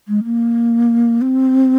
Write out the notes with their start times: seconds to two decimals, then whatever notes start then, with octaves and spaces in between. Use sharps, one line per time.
0.08 G#3
0.24 A#3
1.22 C4